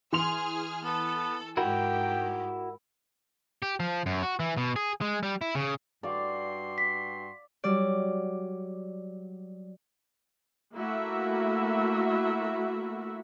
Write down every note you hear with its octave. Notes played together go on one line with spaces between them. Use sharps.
E3 G#4 C6 F6 F7
B3 A4
G#2 D#3 E4 F#4 G4 A#4 G5
G4
F3
F#2
F#4
E3
B2
G#4
G#3
G3
E4
C#3
G2 F#4 D5 F5 C6
B6
F#3 G3 D5
A3 A#3 E4 F#4 E5